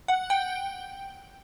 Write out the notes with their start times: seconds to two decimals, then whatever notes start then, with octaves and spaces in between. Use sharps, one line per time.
0.08 F#5
0.30 G5